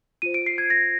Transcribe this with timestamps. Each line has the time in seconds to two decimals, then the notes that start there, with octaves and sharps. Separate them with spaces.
0.22 F4 C5 D#7
0.34 D7
0.46 C7
0.58 G#6
0.70 A#6